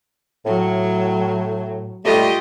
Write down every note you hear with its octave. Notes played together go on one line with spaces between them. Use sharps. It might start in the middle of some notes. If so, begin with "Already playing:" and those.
A2 F#3
G3 A3 F4 G4 D#5